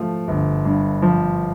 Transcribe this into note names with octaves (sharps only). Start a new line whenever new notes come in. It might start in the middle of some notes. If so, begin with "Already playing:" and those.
Already playing: F3 A3
G1
G2
F3